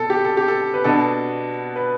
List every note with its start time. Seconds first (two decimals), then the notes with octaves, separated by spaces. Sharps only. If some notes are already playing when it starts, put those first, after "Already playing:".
Already playing: B2 A4
0.10 G4
0.25 A4
0.37 G4
0.48 A4
0.74 B4
0.84 B2 B3 D4 A4
1.76 B4